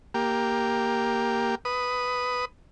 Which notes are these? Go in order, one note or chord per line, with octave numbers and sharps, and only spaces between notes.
A#3 G4
B4 D#6